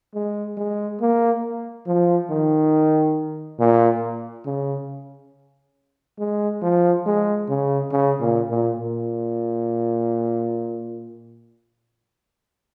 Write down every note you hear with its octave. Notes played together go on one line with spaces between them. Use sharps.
G#3
G#3
A#3
F3
D#3
A#2
C#3
G#3
F3
G#3
C#3
C#3
A#2
A#2
A#2